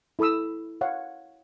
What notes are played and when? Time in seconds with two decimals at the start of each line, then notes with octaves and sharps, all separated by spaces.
0.19 E4 A4 B5 D#6 E6
0.81 C#5 F5 F#5